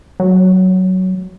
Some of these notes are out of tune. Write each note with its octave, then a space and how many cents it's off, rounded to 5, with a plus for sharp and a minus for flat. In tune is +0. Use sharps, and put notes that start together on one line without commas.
F#3 +10